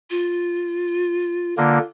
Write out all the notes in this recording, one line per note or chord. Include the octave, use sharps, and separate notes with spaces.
F4
D3 A#3 F4